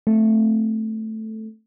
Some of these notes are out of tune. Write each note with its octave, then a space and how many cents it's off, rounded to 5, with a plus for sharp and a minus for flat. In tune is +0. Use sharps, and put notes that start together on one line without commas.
A3 +0 C4 +0